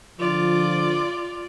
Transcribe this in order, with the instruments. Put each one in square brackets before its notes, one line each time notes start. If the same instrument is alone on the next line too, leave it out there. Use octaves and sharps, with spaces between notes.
[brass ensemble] D3 F3 [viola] F4 D5